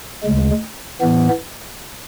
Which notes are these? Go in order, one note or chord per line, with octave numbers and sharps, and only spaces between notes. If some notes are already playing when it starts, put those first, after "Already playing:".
D2 C#3 G#3
A2 E3 B3